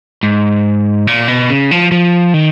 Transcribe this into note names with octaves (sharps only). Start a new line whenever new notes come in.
G#2
A#2
B2
C#3
F3
F3
D#3